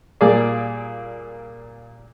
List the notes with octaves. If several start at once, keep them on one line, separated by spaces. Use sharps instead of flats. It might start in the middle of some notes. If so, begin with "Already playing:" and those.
A#2 G3 A#3 G#4 D5